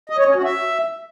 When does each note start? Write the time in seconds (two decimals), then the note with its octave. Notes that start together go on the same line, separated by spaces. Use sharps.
0.10 D#5
0.18 C#5
0.27 C#4
0.36 F#4
0.44 E5